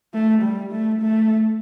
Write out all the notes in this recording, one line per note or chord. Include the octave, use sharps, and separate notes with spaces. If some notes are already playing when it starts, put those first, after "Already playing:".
A3
G3
A3
A3